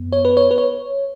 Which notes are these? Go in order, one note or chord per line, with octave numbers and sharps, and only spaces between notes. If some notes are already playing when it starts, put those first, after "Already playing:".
Already playing: F#2 B3
C#5
B4
C#5
B4
C#5